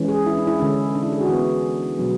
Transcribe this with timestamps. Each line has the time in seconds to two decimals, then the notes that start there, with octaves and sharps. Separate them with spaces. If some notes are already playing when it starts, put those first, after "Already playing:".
Already playing: E3 G#3 C#4
0.09 G#4
0.26 E4
0.37 D4
0.47 E4
0.60 D3 G#3 C#4
0.95 D4
1.03 E4
1.13 G#4
1.21 F#4
1.29 E3 B3 E4
1.98 B2 F#3 B3 D4